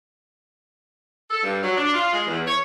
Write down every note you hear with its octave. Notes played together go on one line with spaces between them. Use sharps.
A4
G2
F#3
D4
F4
G#3
E2
C#5